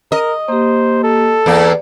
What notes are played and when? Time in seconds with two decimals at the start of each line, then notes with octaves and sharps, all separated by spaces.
0.12 A#4 D#5
0.48 A#3 G4 C5
1.03 A4
1.46 E2 A#3 D5